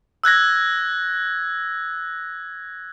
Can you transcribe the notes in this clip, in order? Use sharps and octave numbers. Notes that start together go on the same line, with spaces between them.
E6 F#6 G#6 A#6